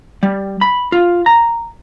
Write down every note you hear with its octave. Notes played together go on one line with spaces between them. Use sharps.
G3
B5
F4
A#5